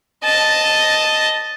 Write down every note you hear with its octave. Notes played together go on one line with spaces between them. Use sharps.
D#5 A5